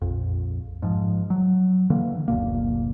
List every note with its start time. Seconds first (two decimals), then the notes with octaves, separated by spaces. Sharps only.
0.02 A#1 F2
0.82 G#2 F3
1.30 F#3
1.90 D3 E3 A#3
2.28 F#1 D2 B2 A#3